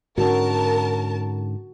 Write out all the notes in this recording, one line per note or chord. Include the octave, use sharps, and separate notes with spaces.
G#2 D3 C#4 F#4 A#4 A5